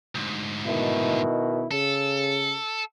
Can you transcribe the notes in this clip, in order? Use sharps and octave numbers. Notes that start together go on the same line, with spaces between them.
D2 G#2
B2 D#3 E4
C#3 A4